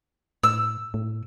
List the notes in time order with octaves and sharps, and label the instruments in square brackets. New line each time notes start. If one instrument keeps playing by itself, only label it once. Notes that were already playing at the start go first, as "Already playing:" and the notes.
[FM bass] A2 [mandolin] E6
[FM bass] A2